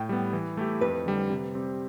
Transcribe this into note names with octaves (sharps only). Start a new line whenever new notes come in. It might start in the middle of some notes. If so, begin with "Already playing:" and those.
Already playing: A2 G5
G3 B3
E3
A3 E4 G4
F2 B4
D3 G3
C3
G3 C4 G4